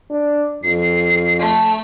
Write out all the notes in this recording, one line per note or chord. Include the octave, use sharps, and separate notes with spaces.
D4
F2 C7
A3 B6